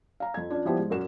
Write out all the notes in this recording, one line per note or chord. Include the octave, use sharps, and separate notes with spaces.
F5 A#5
F2 G#6
C#4 D4 F4 D5
F3 G3 B3 E4 G4 C5
G#2
F#2 A#2 A#3 F#4 E7